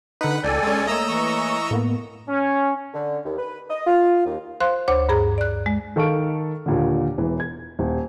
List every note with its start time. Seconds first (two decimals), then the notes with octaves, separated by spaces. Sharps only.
0.21 D3 D#4 B4 F#5
0.44 C#2 A4 D5 G5 G#5
0.63 G#3 C#4
0.87 A3 A#3 C#5 D#5 A#5 E6
1.08 E3 C#6
1.71 A2 A#3 B3
2.29 C#4
2.94 D3
3.25 D#2
3.38 B4
3.70 D#5
3.87 F4
4.26 D#2
4.60 C5 F5 C6 F#6
4.88 D2 C5 C#5 D6
5.09 G2 G#4 A#5
5.38 D5 F#6
5.66 G#3
5.96 D#3 A4 F5 C#6 F6 D7
6.66 D#2 A#2 D3
7.18 E1 E3
7.40 G#6
7.79 D#1